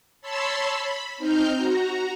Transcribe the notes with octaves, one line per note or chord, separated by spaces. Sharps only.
C#5 A5 B5 C6 E6
B5
C4 D#4 F6 G6
F#4 A#5